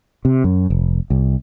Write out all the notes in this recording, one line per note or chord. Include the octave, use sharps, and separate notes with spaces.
C3
F#2
F1
C2